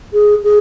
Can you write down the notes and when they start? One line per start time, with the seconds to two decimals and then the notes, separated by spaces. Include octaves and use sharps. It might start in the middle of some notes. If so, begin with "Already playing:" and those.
0.13 G#4
0.43 G#4